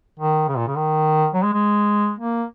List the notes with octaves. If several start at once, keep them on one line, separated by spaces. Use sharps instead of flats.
D#3
C#3
A#2
C#3
D#3
F#3
G#3
G#3
A#3